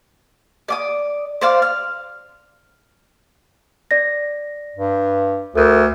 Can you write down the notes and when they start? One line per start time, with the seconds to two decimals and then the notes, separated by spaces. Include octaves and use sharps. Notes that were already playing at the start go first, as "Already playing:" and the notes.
0.68 D5 D6 D#6
1.41 C5 D5 F5
1.62 F6
3.91 D5 A#6
4.76 G2
5.55 D2 A4 A#4